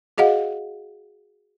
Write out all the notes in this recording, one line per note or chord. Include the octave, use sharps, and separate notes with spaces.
F#4 G#4 D#5 F5 F#5